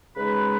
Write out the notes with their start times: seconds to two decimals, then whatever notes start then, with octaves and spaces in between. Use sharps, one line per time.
0.15 C#3 G#3 D#4 B4